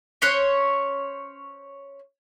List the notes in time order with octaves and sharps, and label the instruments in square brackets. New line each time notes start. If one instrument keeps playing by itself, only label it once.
[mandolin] C#4 C5 C#5 F#6